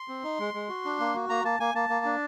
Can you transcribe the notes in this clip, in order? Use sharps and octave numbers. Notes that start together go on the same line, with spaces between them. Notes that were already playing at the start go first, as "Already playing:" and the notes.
Already playing: C6
C4
D#4
G#3
G#3
F#4
D4
A#3
F#4
A#3 A#5
A#3 A5
A#3 G#5
A#3 A5
A#3
D4